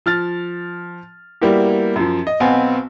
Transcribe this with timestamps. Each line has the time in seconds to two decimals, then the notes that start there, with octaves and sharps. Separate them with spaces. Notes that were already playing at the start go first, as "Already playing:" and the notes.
0.06 F3 F6 A6
1.41 G3 A#3 B3 E4 F#4 G4
1.96 F#2 F3
2.27 D#5
2.40 B1 B3 C4 F5 G#5